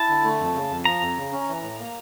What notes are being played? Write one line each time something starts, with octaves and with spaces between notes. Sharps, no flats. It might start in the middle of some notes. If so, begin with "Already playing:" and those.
Already playing: E4 A5
D3
A3
F2
C#3
F2
F3 A#5
F2
C#3
C#4
E3
A2
A#3